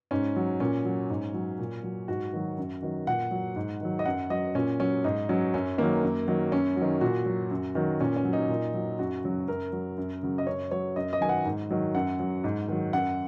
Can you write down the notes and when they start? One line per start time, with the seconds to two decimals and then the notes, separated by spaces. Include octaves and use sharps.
0.11 G#2 C#4
0.36 F#3
0.60 A#2 C#4
0.85 F#3
1.10 G#2
1.34 F#3
1.59 A#2
1.83 F#3
2.08 G#2 F#4
2.33 D#3 F#3
2.58 F#2
2.82 D#3 F#3
3.07 A#2 F#5
3.31 F#3
3.56 G#2
3.81 D#3 F#3
3.99 D#5
4.05 F#2 F#5
4.30 F#3 D#5
4.55 A#2 C#4
4.80 F#3 C#4
5.04 G#2 D#4
5.29 F#3 C#4
5.54 F#2 C#4
5.78 D#3 F#3 A#3
6.03 F#2
6.28 D#3 F#3
6.52 F#2 C#4
6.77 D#3 F#3
7.01 A#2 F#4
7.26 F#3
7.51 F#2
7.75 D#3 F#3
8.00 A#2 C#4
8.16 C#4
8.25 F#3
8.33 D#4
8.49 A#2
8.74 F#3
8.99 F#2 F#4
9.24 C#3 F#3
9.48 F#2 A#4
9.73 F#3
9.98 F#2
10.23 C#3 F#3
10.38 D#5
10.47 F#2 C#5
10.71 F#3 C#5
10.96 F#2 D#5
11.13 D#5
11.21 D#3 F#3 G#5
11.29 F#5
11.45 G#2
11.70 D#3 F#3
11.95 F#2 F#5
12.19 F#3
12.44 G#2
12.68 D#3 F#3
12.93 F#2 F#5